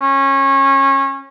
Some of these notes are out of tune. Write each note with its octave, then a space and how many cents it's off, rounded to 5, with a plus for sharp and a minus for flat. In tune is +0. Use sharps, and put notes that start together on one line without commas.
C#4 -25